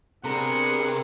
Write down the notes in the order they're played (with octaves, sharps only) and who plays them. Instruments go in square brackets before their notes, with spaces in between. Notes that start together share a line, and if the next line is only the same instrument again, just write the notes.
[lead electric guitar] C3 [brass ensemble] B3 D4 G#4 [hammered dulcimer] A#4 A#5 B5 [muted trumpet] F#5